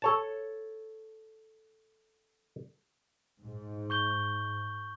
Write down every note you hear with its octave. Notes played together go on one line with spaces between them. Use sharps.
A4 C#5 A5
G#2
C#6 G6 G7